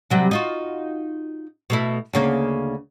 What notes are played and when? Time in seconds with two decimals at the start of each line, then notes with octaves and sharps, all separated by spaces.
0.10 C3 F#3 G3
0.31 D#4 F4 F#4
1.70 B2 A3 E4
2.13 D2 C#3 A#3